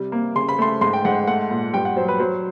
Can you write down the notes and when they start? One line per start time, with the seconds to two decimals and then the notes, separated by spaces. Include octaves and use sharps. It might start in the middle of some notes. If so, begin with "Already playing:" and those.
Already playing: C3 G3
0.12 A#3
0.35 C#3 C6
0.49 B5
0.59 A3 C6
0.81 G#2 C6
0.93 G5
1.05 G#2 F#5
1.27 A3 F#5
1.51 A#2
1.73 G2 G5
1.85 F#5
1.97 F#3 C5
2.08 B4
2.20 F#3 C5